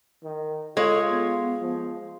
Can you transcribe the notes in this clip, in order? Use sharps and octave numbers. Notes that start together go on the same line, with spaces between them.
D#3
G#3 F4 A4 C#5
B3
F3